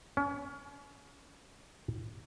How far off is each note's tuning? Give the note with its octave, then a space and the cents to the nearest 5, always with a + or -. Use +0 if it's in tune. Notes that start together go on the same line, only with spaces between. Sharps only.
C#4 +30